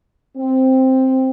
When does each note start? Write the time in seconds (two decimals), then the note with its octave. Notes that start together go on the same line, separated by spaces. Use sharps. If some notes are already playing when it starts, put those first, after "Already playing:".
0.37 C4